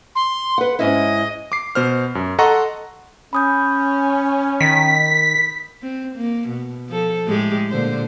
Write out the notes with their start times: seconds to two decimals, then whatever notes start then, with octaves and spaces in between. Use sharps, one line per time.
0.15 C6
0.58 B4 F#5
0.79 G#2 C#4 E4 D#5
1.52 D6 C7
1.75 B2 C5 F6
2.15 F#2
2.39 A4 D#5 F#5 A#5 C6 C#6
3.33 C#4 B5 D#6 G6
4.60 D#3 B6
5.82 C4
6.16 A#3
6.49 B2
6.89 F3 A4
7.26 A2 G#3 G4
7.70 A#2 D3 C5